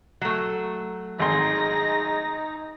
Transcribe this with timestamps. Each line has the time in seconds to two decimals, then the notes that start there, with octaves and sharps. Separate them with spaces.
0.21 F#3 A3
1.19 G#1 D#4 G#4 C6 A#6